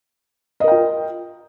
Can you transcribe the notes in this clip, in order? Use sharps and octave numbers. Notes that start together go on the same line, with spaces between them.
F4 A#4 D#5 G5